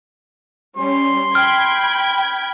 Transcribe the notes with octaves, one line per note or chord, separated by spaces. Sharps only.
G3 C#4 C6
G5 B5 F6 G#6